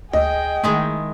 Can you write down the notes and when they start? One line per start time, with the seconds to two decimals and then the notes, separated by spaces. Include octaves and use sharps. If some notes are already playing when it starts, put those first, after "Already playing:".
0.13 D2 G#4 D#5 G5
0.64 D#3 G#3 A3 E4